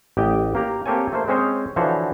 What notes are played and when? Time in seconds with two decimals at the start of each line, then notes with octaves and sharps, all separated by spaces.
0.17 A1 G4 D#5 G5
0.55 A#3 G4 A#5
0.86 A#3 C4 G4 A4 C#5 G#5
1.12 A3 A#3 C5
1.28 G#3 C4 C#4 C5 C#5 D#5
1.76 D3 E3 F3 F#4 C5 C#5